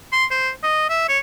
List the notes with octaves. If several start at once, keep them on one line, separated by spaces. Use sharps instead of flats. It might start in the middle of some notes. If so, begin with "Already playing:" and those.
C6
C5
D#5
E5
C#5